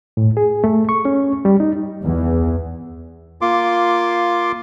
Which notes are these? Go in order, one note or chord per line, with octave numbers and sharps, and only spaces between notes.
A2
G#4
A3
C#6
C#4
G3
D#4
E2
A#3 F4 C6 D6